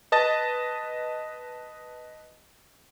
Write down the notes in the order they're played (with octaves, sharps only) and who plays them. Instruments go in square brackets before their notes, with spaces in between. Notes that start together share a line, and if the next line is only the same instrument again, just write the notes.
[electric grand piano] B4 D#5 A5 A6